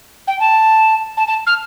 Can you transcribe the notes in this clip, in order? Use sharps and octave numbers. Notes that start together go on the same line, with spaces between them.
G5
A5
A5
A5
F6